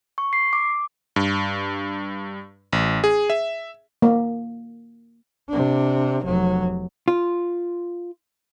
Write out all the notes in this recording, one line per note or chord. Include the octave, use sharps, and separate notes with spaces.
C#6
C7
D6
G2
A1
G#4
E5
A#3
C3 D4
F1 F#3
F4